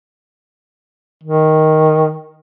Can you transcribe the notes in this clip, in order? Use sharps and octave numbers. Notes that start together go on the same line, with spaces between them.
D#3